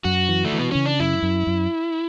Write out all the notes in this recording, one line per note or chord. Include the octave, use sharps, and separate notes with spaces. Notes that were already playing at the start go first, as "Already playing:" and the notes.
F#2 F#4
E3
A3
E3
B3
C#3 C#4
D4
F#2 E4
F#2
F#2